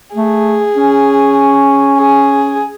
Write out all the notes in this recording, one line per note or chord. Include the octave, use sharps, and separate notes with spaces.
A3 G#4
C#4
G#4